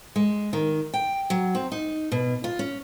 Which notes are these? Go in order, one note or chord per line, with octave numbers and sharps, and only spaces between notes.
G#3
D#3
G5
F#3
C4
D#4
B2
F4
C#4